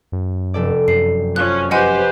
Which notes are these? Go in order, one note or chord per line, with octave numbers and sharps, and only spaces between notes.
F#2
F1 A4 D5
F#2 C7
F3 C#4 F#6
G4 B4 C5 D#5 F#5 G#5